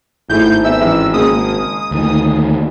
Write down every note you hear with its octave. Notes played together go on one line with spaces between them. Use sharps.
G#1 A2 A3 E4 G6
B3 E5 E6
A1
C#3 G#3 A#3 D#6
D2 D#3